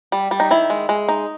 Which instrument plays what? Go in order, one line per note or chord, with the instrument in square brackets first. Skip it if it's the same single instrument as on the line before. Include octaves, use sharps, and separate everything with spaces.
[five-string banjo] G3
G3
D#4
D#3 E4
G#3
G#3
D#4